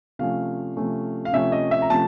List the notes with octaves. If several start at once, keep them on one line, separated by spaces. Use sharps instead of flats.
C3 F3 A3 C#4 F5
C3 F3 A3 C#4
F5
C3 F3 A3 C#4 E5
D#5
E5
A#5
C3 F3 A3 C#4 A5